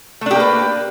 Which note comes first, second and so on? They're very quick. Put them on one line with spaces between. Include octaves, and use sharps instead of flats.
A3 D4 G4 A#3 B4